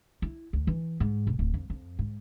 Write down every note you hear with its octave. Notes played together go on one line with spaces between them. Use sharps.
E4
D2
E3
G#2
E1
D1
F2
F2
G#2